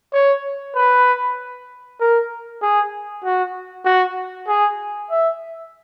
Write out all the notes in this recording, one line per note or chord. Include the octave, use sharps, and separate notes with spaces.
C#5
B4
A#4
G#4
F#4
F#4
G#4
E5